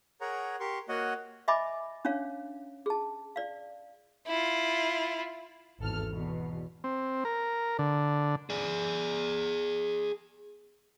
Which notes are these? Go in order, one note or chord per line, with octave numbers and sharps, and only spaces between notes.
G#4 A#4 C#5 F#5 A#5
G4 A#4 C6 C#6
A#3 F#4 C#5 D#5 F#5
D#5 E5 G#5 B5 D6
C#4 D4 C#5 F5
G#4 A5
D5 F5
E4 F4
G#1 E2 A4 F6
E2 B2
C4
A#4
D3
G#4 D5